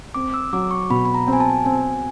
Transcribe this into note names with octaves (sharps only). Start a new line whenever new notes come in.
C4 D6
E6
F#3 D6
C#6
B2 B5
B5
A#5
C4
G#5
A5
C4 G#5